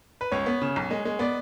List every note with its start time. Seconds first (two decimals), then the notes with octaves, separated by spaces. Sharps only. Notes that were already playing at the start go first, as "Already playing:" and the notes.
0.21 B4
0.32 C#2 C#5
0.46 B3
0.61 C#3
0.76 B1
0.91 G#3
1.05 G#3
1.19 B3 D5